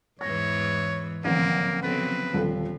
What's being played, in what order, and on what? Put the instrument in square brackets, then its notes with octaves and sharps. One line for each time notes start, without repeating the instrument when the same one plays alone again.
[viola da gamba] E2 G#2 E3 [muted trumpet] C#5 [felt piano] A#6
[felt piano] A1 D#7 [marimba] D3 F3 F#3 [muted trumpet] A#3 [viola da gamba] C4
[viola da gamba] C#3 F#3 C4 [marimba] B3 A4 [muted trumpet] B4
[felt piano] D#1 A4 [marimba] D3 [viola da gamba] F3